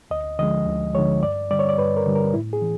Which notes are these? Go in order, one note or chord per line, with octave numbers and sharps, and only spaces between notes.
D2 D#5
D3 F3 G#3 D#5
D2
D3 F3 G#3 C#5
G2 D5
D3 G3 D5
C#5
D5
G2 B4
A#4
D3 G3
A#4
A2 E4
G#4
E3